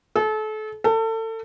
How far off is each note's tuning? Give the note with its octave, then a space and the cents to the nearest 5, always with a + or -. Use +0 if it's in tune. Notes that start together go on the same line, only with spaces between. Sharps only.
A4 -35
A4 +30